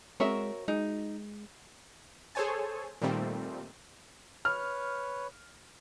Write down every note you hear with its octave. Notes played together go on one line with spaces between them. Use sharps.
G#3 C4 F#4 A#4 C#5 E5
G#3 D#4
G#4 A4 C5 C#5 G#5 A5
A#2 D#3 G3 A3 C4
B4 C#5 F6